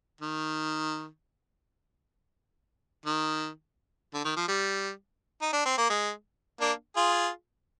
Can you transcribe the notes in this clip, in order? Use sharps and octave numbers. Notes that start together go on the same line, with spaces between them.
D#3
D#3
D3
D#3
F3
G3
D#4
D4
C4
A#3
G#3
A#3 D4
F4 G#4